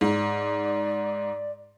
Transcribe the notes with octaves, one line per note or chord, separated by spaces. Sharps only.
G#2 D5